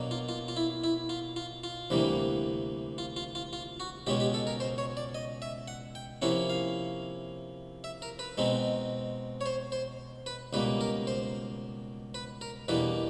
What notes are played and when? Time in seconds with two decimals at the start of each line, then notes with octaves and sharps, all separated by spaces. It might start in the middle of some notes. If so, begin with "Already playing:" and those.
Already playing: B2 F#3 A#3 D4
0.11 F4
0.29 F4
0.48 F4
0.57 E4
0.84 E4
1.09 F4
1.36 F4
1.64 F4
1.90 D2 C3 E3 G3 A#3
2.98 F4
3.17 F4
3.35 F4
3.53 F4
3.80 F#4
4.07 C#2 B2 G#3 C#4 G4
4.20 G4
4.34 A4
4.47 A#4
4.60 C5
4.78 C#5
4.97 D5
5.15 D#5
5.42 E5
5.68 F#5
5.95 G5
6.22 C3 F3 A#3 C#4 E4 F#5
6.50 F5
7.84 E5
8.02 A#4
8.19 B4
8.38 B2 G#3 C4 D#4
9.41 C#5
9.46 C5
9.72 C5
10.26 B4
10.53 C#2 B2 G3 A#3 B4
10.81 A#4
11.07 C5
12.14 B4
12.41 A#4
12.68 E2 B2 G3 A#3 D4 B4